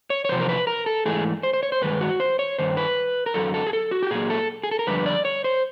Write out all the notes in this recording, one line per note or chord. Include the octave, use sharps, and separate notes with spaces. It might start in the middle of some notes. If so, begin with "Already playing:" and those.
C#5
C#5
E2 C3 F3 C5
A#4
B4
A#4
A4
G#2 E3 A3 G#4
C5
C5
C#5
C5
G2 D#3 G#3 B4
F#4
C5
C#5
G2 D#3 C5
B4
A#4
F#2 D3 F#3 A4
A4
G#4
A4
F#4
G4
A#2 F#3 A#3 G#4
A4
G#4
A4
A#4
F2 D3 G3 B4
D5
C#5
C5